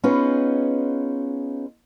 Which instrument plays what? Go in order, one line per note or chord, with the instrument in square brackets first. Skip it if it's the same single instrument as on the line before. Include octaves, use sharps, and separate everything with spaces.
[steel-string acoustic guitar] B3 C#4 D#4 F4 G#4 B4